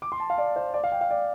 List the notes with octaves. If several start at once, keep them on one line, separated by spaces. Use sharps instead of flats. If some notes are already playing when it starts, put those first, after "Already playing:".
D6
C6
A5
F5
D5
C5
D5
F5
G5
F5
D5